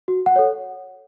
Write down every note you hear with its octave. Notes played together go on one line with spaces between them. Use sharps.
F#4
F#5
A4 C#5